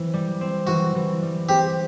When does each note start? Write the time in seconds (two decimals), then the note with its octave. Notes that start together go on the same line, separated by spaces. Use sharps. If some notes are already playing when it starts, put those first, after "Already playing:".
Already playing: E3 C4
0.13 G3
0.41 C4
0.67 E3 F#4
0.95 E3
1.22 G3
1.49 C4 G4